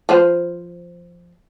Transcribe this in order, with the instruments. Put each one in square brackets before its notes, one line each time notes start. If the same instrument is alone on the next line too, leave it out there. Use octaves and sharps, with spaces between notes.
[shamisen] F3 B4 C5